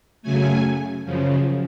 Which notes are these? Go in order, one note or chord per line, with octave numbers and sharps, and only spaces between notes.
F#2 C#3 F#3 A3 G#5
F#2 C#3 F3